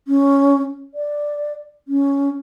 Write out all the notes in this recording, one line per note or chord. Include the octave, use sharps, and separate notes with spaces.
C#4
D5
C#4